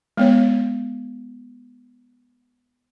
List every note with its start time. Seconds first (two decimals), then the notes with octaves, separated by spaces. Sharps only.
0.17 G#3 B3 C#5